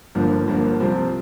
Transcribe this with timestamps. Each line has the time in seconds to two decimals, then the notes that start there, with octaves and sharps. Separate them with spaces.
0.15 G1 G2 D3 F3 A#3
0.48 G1 G2 D3 F3 A#3
0.80 C2 C3 F3 C4